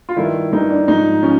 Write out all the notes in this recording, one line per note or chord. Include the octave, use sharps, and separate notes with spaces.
F4
G2 D#3 E4
G2 D#3 D#4
D4
G#2 F3 D#4
F3 C#4